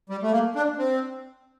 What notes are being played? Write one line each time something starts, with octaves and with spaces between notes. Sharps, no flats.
G3
A3
A#3
D4
C4